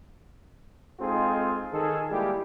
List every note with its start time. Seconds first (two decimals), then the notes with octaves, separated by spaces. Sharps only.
1.00 G#3 C4 D#4 F4 G#4 A4
1.72 D#3 G#4 A4
2.11 G3 G#3 A#3 E4 G4